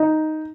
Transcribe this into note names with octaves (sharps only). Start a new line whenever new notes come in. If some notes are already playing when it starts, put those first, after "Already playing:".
Already playing: D#4